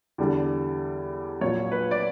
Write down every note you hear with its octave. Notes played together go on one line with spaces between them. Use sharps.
E2 D3 G3
A#1 A#2 F#3 C#5
B4
D5